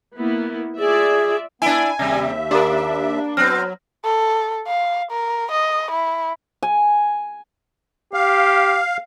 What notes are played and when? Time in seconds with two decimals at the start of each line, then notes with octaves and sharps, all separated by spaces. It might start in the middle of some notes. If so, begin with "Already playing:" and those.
0.18 A#3 B3 E4
0.79 F4 G#4 D5 E5
1.62 B3 D4 E4 G#5
1.99 D#2 C3 G3 E5
2.51 A#3 D4 G4 A#4
3.37 F#3 B3 C4 F6 F#6
4.05 A4
4.67 F5
5.12 A#4
5.51 D#5
5.91 E4
6.63 G#5
8.13 G4 F5